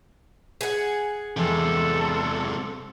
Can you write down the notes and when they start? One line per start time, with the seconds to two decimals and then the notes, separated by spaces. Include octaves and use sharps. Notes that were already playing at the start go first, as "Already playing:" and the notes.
0.61 G#4 F#5
1.37 E2 C3 G3 G#3 A4